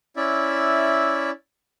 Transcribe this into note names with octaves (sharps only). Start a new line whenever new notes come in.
C#4 E4 D5 E5